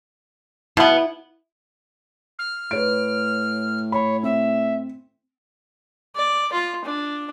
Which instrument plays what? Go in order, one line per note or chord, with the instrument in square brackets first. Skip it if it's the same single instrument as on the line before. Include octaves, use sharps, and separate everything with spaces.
[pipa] B2 B3 [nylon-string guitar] E4
[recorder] F6
[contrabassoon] A2 [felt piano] B4 C#5 D7
[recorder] C#5 [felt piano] B5
[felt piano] C4 [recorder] E5
[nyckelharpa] D5
F4
D4